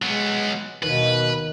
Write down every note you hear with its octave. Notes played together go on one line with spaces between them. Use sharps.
F#3 G#3 B3
D#2 B2 B4